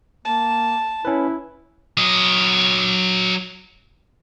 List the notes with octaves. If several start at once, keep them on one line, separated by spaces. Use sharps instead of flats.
A#3 A5
C#4 E4 B4
F#3 D#5